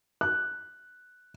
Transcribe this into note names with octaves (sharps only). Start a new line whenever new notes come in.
F#6